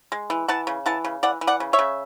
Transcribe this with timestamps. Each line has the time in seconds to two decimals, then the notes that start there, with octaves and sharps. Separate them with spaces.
0.12 G#3
0.30 E3
0.48 E3 F#5 A5
0.67 C#3
0.86 E3 F#5 A5
1.04 C#3
1.23 E3 D5 F#5
1.41 E3
1.47 D5 F#5
1.60 C#3
1.73 C#5 E5
1.79 C#3